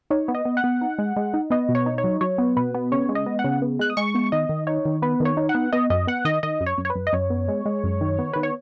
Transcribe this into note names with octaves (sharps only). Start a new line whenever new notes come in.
D#4 C#5
B3
D#5
B3
F#5
B3
D#4
G#3
G#3
D#4
B3 D#5
B2
C#5
D#4
C#5
F#3
F#3 C#5
B3
B2 B4
B3
C#3 C#5
G#3
D#5
B3
F#5
C#3
B3
G#3 F#6
D#6
G#3 C#6
B3
D#3 D#5
D#3
D#4 C#5
D#3
B3 B4
D#3
C#5
D#4
F#5
B3
B3 D#5
F#2 D#5
B3 F#5
D#3 D#5
D#3 D#5
F#2
C#5
F#2
C#5
B4
F#2
D#5
F#2 C#5
B3
G#3
G#3
F#2
D#3
B3
D#3 B4
C#5